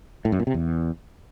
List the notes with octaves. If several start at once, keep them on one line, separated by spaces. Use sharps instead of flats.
A2
F#2
A#2
C3
E2